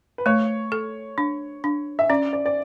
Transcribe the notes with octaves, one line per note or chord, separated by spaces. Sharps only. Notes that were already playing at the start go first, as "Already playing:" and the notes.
B4
A3 C#5
A4
D4
D4
E5
C#4 D5
D5
D5